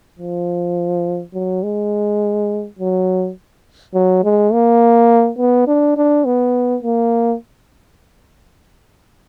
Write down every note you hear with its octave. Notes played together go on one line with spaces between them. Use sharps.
F3
F#3
G#3
F#3
F#3
G#3
A#3
B3
D4
D4
B3
A#3